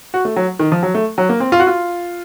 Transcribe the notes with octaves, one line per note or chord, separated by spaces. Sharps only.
F#4
A3
F#3
D#3
F3
F#3
A3
F#3
A#3
C4
F4
F#4
F4